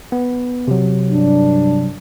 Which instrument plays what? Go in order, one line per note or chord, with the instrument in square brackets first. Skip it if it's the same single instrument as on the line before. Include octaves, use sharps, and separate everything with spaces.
[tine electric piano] B3
C3 F#3
[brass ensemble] G2 D4